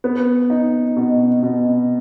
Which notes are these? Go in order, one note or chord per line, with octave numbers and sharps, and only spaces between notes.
B3
D#4
B2
B2